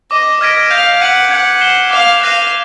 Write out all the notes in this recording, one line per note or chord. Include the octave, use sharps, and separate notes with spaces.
D#5 D6
D#5 F6 G#6 B6 D7
F5 G6
F#5 B6 D#7 F#7
F#5 G#6
C7 E7 G7
F5 D6
F5 F#6 A#6 D#7